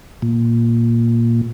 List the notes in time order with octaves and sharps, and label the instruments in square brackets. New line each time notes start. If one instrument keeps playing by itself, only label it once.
[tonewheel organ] A#2